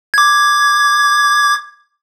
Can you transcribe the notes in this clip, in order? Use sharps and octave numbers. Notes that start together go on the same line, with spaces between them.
D6 G#6